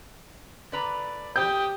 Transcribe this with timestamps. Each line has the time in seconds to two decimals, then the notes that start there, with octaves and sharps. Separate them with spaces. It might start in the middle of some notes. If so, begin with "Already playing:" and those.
0.72 D3 B4 D5 A#5
1.36 G4 D#6 G6